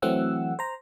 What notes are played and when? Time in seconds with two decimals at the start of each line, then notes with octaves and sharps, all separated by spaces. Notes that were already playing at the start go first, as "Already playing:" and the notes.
0.02 E3 F#3 A3 C4 F#5 E6
0.59 C5 A#5